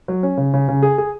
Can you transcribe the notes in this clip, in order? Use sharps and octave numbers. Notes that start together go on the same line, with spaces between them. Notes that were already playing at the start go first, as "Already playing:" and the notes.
F#3
C#4
C#3
C#3
C#3
G#4
G#4